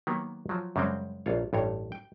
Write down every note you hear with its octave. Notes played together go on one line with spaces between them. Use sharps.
D#3 F#3 A#3 B3
F3 F#3
F#2 C#3 G3 G#3 C4 G5
A#1 F4 C#5
A1 G2 C#5
G5